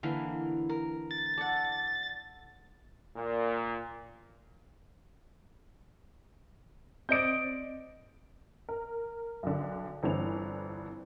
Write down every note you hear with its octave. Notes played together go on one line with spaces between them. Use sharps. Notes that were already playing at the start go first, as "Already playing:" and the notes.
D3 E3 A#3 F5
A#4
A6
A4 D5 F#5
A#2
C4 D5 D#5 G6 D7
A#4
B1 D3
G1 D3 E3 C4 F7